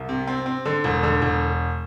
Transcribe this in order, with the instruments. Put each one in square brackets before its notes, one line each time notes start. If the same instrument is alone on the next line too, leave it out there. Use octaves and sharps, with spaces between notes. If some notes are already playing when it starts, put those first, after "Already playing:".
Already playing: [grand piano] C2
C3
C4
C4
D3
E1
D3
E1